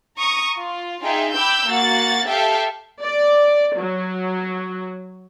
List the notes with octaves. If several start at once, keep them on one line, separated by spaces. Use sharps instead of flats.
A#5 C#6 D#6
F4
D#4 F4 G#4 E5 G5
G5 B5 D6 E6 G6
A#3 F#4 F#5 A6
G4 A4 E5 F5 G5
D5
F#3